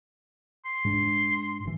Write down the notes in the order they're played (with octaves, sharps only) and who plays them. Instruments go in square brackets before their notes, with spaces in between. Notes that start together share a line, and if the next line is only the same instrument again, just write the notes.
[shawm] C6
[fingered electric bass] G#2 D4
F#1 E3